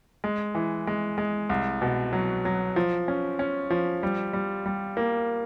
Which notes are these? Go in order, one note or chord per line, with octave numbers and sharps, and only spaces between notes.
G#3
E3
G#3
G#3
C2
B2
F#3
F#3
F3
C#4
C#4
F3
G3
G3
G3
A#3